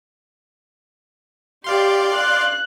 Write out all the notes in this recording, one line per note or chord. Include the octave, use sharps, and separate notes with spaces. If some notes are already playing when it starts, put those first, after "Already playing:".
G4 D5 F5 C6
F#6